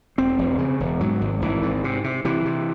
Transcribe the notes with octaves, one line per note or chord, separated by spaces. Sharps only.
E1 C4
E1
C#3
E1
G#2 F#3
G#1
G#1 E3
G#2
C3
C3
C3 E3
C3